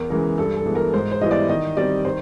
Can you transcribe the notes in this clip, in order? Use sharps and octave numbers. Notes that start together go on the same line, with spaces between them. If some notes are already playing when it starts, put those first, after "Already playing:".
Already playing: E2 A#4
C#3 E3 G#3 A#4
G2 A4
A4
E3 G#3 B3
A#4
G#2 C5
C5
E3 G3 B3 E4 D#5
D5
D#3 D#5
G3 C4 D5
D#3 C5